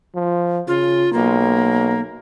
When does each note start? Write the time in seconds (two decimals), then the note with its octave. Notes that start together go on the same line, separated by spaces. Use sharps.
0.15 F3
0.67 C#3 F4
1.13 B1 A#3